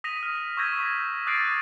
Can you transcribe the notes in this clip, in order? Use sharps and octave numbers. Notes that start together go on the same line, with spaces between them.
D#6 A#6 B6 D#7 F7
F6
C#6 E6 G6 G#6 A#6 D#7
B6
D6 D#6 F#6 A6 C7 D7